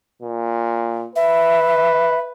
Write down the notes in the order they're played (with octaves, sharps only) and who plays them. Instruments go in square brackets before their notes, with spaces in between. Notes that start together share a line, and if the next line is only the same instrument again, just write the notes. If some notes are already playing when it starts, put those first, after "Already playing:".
[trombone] A#2
[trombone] B4 [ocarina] E5